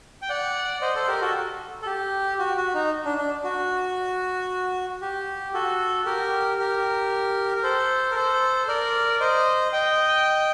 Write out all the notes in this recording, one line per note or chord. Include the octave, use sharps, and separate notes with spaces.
G5
D5 F#5
C5 D#5
A4 C5
G4 A#4
F#4 A4
A4
G4
F#4
F#4
D#4
D4
D4
F#4
G4
F#4 A4
G4 A#4
G4 A#4
A#4
A4 C5
A#4
A4 C5
A#4 D5
C5 D#5
D#5 G5